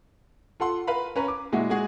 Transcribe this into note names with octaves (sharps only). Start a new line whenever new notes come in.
F4 A4 F#5 C6
A#4 B4 F5 B5
C#4 B4 A#5
D6
A#2 G#3 E4 F#4
G#3 F#4 G#4